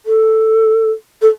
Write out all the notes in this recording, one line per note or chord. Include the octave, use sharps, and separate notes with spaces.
A4
A4